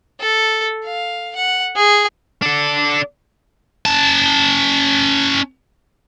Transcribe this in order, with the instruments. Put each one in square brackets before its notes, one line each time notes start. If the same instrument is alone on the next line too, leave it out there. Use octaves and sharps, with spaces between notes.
[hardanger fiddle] A4
F5
F#5
G#4
[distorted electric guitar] D4 A4
C#4 A5